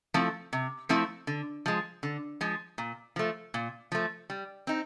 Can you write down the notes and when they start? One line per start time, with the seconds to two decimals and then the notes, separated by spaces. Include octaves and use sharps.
0.14 F3 A3 C4 E4
0.53 C3
0.89 F3 A3 C4 E4
1.27 D3
1.66 F3 G#3
2.03 D3
2.41 F3 G#3
2.78 A#2
3.16 F3 A3
3.54 A#2
3.92 F3 A3
4.30 G3
4.67 C4 D#4